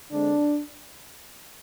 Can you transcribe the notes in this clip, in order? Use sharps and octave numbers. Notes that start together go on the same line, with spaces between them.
D3 G#3 C4 D4